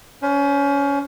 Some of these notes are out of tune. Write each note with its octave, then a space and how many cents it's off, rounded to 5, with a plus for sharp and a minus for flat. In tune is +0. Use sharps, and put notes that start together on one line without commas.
C#4 +25 C5 +0